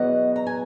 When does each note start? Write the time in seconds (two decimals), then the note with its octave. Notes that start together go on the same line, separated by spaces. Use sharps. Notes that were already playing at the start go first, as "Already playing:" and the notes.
Already playing: E2 B2 F#3 B3 D#5 F#5
0.36 A#5
0.47 G#5